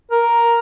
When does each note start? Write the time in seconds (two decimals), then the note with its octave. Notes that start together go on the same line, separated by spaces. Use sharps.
0.11 A#4